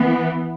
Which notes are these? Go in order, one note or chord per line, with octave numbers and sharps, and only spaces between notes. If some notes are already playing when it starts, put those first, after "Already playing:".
Already playing: E3 B3